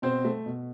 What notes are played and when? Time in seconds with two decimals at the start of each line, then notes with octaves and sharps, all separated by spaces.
0.02 B2 C4 C5
0.25 A3
0.46 B2